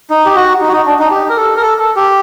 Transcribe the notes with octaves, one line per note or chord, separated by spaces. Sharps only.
D#4
G4
F#4
D#4
F#4
D#4
D4
D#4
G4
A#4
A4
A#4
A4
A4
G4